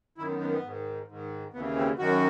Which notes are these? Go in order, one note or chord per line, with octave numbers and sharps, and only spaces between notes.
F#2 D#3 E4
B3
B3
B3
G#2 D#3
G#2 D#3
D#2 C#3 E3 B3
C4
F#2 D#3 F#4